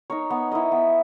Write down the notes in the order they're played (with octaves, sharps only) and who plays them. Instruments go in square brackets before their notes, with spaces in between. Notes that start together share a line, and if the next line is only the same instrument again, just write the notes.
[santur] D#4 A#4 C#5
B3
E4 A#4 D#5
B3